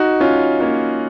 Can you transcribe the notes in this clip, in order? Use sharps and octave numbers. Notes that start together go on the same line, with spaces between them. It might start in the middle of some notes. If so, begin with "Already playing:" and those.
Already playing: D#4 F#4
C#4 F4
A#3 C#4